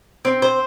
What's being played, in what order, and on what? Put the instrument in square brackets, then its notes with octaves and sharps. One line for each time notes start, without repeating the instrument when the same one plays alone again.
[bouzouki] C4
C5